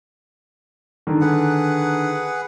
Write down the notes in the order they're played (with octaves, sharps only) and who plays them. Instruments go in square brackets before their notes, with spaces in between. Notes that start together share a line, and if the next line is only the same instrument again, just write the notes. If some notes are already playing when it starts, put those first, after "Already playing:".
[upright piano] D3 D#3 A#4
[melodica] G#4 B4 F#5